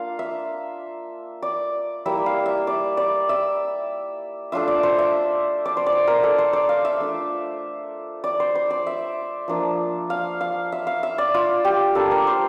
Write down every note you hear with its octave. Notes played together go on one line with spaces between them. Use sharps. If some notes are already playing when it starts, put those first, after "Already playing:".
Already playing: A#3 D4 F4 F5
E5
D5
G3 A#3 E4 E5
F5
E5
D5
D5
E5
A3 D4 F4 E5
D5
C5
E5
D5
C5
D5
C5
A#4
A4
C5
D5
F5
E5
A3 D4 F4
D5
C5
C5
D5
E5
F3 A#3 D4 F4
F5
F5
E5
F5
E5
D5
F4
G4
G3 A#3 D4 A4
A#4
C5